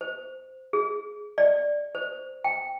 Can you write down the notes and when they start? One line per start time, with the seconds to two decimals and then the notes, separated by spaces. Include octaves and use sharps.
0.01 C5
0.73 G#4
1.38 D5
1.95 C5
2.44 G5